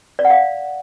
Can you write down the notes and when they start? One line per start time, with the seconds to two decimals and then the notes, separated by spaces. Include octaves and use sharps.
0.19 D5
0.25 F#5
0.30 F5